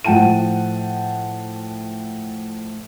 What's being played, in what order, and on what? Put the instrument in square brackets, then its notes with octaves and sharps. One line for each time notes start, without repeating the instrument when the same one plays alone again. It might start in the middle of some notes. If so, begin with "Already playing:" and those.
[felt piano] A2 F3 F#5 G5 A5 D#7